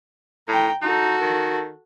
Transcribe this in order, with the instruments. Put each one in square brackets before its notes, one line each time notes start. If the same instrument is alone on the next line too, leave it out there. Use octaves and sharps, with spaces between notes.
[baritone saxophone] A2 [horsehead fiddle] G5 A#5
[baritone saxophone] D#4 [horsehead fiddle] F#4 A4
[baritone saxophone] D#3